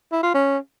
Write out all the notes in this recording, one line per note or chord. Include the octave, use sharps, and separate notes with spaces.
E4
F4
C#4